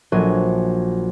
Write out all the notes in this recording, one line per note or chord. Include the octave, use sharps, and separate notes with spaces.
A#1 F#3 G#5